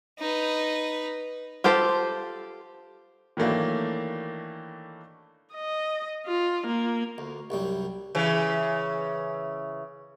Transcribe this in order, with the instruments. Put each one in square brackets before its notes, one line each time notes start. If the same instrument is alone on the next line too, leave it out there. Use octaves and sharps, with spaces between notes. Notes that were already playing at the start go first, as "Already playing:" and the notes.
[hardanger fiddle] D#4 B4
[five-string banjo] F4 G4 A4 C5
[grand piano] D#3 E3 F#3 A3 A#3 D4
[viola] D#5
F4
A#3
[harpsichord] D2
C2 F#2 G3
[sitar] C#3 E3